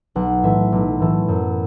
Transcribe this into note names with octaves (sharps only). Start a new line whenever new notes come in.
B1 F#5
A2 E3 A3 E5
B1
A2 E3 A3
F#2